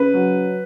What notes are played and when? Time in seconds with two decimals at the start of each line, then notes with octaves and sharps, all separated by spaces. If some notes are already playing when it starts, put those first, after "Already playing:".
Already playing: C#3 B4
0.14 F#3